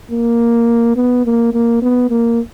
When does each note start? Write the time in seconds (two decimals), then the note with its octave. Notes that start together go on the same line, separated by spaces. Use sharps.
0.11 A#3
0.96 B3
1.25 A#3
1.53 A#3
1.82 B3
2.10 A#3